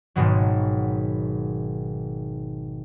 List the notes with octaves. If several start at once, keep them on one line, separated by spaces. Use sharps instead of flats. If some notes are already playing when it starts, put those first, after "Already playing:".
G#1 G#2 B2 F#3